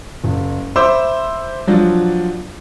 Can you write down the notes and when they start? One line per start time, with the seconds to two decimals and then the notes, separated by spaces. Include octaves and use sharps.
0.24 F#1
0.76 C5 E5 B5 D6 E6
1.67 F3 F#3 D4 F4